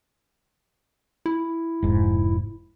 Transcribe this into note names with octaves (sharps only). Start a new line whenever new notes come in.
E4
F1 G#2